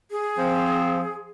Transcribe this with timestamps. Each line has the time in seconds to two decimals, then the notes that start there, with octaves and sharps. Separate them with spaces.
0.11 G#4
0.38 F3 C4